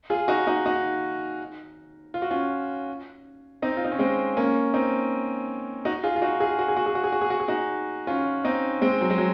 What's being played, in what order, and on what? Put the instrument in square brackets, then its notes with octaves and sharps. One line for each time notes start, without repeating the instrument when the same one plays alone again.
[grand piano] F4 G#4
D#4 F#4
D#4 F#4
D#4 F#4
F4
F#4
C#4 F4
C4 D#4
F4
D#4
C#4
G#3 C4
A#3 C#4
C4 D#4
D#4 F#4
F4 G#4
F4
D#4 F#4
F4 G#4
F#4
G#4
F#4
G#4
F#4
G#4
F#4
G#4
F#4
G#4
D#4 F#4
C#4 F4
C4 D#4
G#3 C4
F#3
G#3
F#3